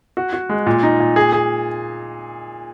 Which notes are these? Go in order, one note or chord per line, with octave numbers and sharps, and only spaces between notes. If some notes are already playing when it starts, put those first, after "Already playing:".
F#4
F#4
G#3
A#2
D#4
A#2
G#4
G#4